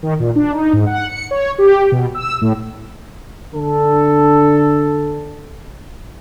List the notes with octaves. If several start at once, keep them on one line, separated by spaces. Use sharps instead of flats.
D#3
A#2
D4
D#4
G#2
F#5
C#7
C#5
G4
B2
E6
A2
D3 D4 A4